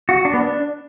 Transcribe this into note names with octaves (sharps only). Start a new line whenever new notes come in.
F#4
D4
B3
D4